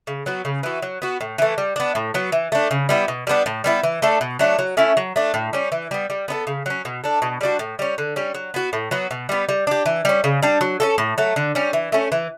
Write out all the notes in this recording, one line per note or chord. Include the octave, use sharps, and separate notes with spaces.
C#3
F#3 B3 F#4
C#3
E3 B3 F#4
F#3
B3 F#4
A2
E3 A3
G3
B3 D4
A2
F#3 B3
E3
A3 D4
C#3
G3 B3 E4
B2
G3 B3 D4
A2
G3 B3 E4
E3
A3 D4 A4
B2
F#3 A3 D4
F#3
A3 C#4 E4
F#3
A3 D4
A2
G3 C#4
E3
G3 B3
G3
B3 D4 A4
C#3
F#3 C#4
B2
A3 D4
B2
G3 D4 F#4
A2
G3 C#4
D3
G3 C#4
F#3
B3 F#4
A2
F#3 B3 F#4
B2
G3 B3
G3
D4 G4
E3
G3 C#4
C#3
G3 D4
F#3
C#4 F#4 A4
A2
F#3 A3
D3
G3 C#4
E3
A3 C#4
E3